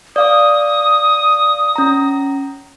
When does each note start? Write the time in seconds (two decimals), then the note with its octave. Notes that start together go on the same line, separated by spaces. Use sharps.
0.16 D5 F5 D6 D#6
1.76 C#4 A#5